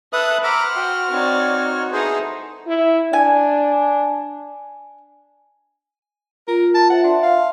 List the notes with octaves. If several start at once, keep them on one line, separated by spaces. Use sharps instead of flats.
A4 B4 E5 D#6 F#6
C5 E5 F#5 A#5 B5 D6 F6
F#4 G5
C4 D#4 C#5 D5
B3 D#4 E4 G#4 A4 C5
E4
D4 G#5
F4 A#4
A5
F4 C5 E5 F#5
D4 E5 C6
F5